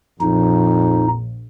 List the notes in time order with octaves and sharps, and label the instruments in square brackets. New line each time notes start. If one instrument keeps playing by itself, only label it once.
[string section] A#1 [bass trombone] F2 [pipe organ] D#4